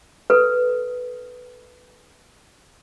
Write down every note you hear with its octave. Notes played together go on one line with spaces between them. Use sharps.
A4 B4